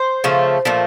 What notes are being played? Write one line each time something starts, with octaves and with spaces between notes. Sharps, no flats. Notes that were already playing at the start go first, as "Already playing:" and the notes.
Already playing: C5
C#3 F3 A3
A#2 F3 A3